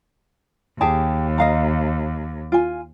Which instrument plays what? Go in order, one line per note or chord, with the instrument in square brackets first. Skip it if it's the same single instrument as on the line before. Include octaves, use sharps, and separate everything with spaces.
[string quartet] D#2 [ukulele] G4 G#4 A5
[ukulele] D#5 F5 A#5
F4 G#5